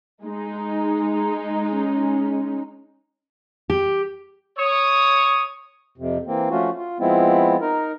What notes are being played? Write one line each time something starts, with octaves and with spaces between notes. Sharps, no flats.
G#3 D#4
C#4
G4
C#5 D#6
F2 C3
E3 A#3 C4
F3 A3 C#4 F4 F#4
F4
F3 G#3 B3 C4 E4
D#4 A#4